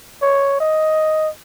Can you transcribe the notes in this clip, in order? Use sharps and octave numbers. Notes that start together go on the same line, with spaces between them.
C#5
D#5